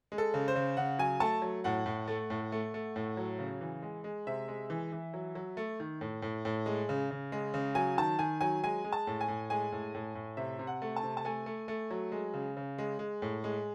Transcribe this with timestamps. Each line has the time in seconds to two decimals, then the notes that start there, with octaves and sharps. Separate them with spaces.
0.12 G#3
0.18 A4
0.34 C#3
0.48 C5
0.55 C#3
0.77 C#3 F#5
0.99 F#3 G#5
1.20 A3 A5
1.42 F#3
1.64 A2 F#5
1.86 A2
2.08 A3
2.30 A2
2.52 A3
2.74 A3
2.96 A2
3.17 F#3
3.39 C#3
3.61 E3
3.82 G#3
4.04 G#3
4.27 C3 E5
4.48 G#3
4.70 E3
4.92 E3
5.14 F#3
5.35 F#3
5.57 A3
5.80 D#3
6.01 A2
6.22 A2
6.45 A2
6.66 G#3
6.89 C#3
7.11 C#3
7.32 G#3
7.54 C#3
7.75 F#3 G#5
7.98 D#3 A5
8.19 D#3 G#5
8.41 F#3 G#5
8.64 G#3 G#5
8.84 G#3
8.93 A5
9.07 A2
9.21 G#5
9.28 A2
9.50 G#3 G#5
9.72 A2
9.95 A2
10.15 A2
10.37 C3 E5
10.59 C3
10.67 F#5
10.82 A3
10.96 A5
11.03 C3
11.17 A5
11.25 A3 G#5
11.46 A3
11.68 A3
11.91 F#3
12.12 G#3
12.34 C#3
12.57 C#3
12.78 G#3
12.99 G#3
13.22 A2
13.44 G#3